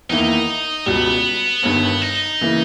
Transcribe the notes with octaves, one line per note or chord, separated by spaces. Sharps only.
E2 D#3 A#3 D#4 E4
C#2 B2 G3 B3
G1 G2 D#3
D#4
C#3 E3 A#3 E4